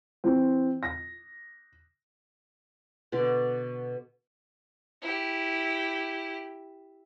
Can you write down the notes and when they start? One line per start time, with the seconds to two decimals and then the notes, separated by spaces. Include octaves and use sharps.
0.24 E3 C4
0.83 A#6
3.12 B2 D3 D5
5.02 E4 G4